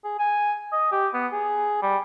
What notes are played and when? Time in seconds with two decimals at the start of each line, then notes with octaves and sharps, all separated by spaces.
0.04 G#4
0.19 G#5
0.72 D#5
0.92 G4
1.14 B3
1.32 G#4
1.82 G3